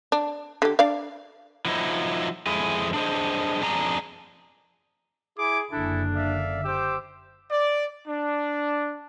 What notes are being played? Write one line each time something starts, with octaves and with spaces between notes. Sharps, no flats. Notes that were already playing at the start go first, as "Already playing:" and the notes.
D4
D3 G4
D4 D5 F5
F3 F#3 D#4 E4
F2 G#3 E4 G#4
D4 G#4 C5 D#5
F2 D4 G#4 A#5
E4 G#4 G#5 D6
F#1 D3 D4 E4 G#4 A4
D5 E5 F5
G4 C5 D6 E6
D5
D4